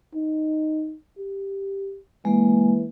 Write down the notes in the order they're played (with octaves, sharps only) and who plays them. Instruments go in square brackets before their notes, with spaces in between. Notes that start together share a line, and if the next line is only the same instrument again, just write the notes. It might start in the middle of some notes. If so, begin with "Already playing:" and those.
[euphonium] D#4
G4
[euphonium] E3 [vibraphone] G#3 A#3